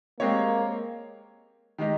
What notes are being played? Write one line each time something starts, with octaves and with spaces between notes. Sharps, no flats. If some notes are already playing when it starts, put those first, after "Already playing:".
G#3 A#3 C4 G4 C#5
D#3 G#3 D#4 G4